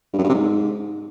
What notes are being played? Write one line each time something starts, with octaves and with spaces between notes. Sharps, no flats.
G2
F#2
G2
C3
G#2